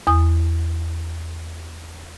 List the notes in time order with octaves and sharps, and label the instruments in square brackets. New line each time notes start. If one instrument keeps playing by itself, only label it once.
[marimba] E2 D#6